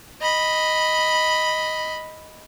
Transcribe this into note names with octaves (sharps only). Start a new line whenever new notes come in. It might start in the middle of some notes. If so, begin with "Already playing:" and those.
D#5 B5